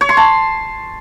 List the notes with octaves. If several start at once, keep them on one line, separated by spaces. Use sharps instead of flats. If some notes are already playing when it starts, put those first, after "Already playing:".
C#5
C6
A5